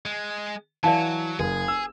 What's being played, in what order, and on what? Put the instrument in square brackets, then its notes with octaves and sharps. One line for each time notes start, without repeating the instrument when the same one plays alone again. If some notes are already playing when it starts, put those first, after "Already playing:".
[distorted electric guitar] G#3
[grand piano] E3 [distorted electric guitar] F#3 [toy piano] D5 F5 A5
[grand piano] F#1 [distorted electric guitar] G#4
[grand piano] E6